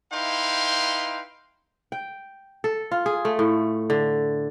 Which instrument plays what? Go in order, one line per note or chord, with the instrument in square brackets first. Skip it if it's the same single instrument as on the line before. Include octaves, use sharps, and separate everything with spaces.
[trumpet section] D#4 E4 B4 F5 G5 C6
[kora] G5
A4
F4
G#4
A3
A2
D3